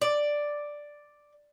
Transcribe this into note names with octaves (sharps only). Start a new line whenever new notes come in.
D5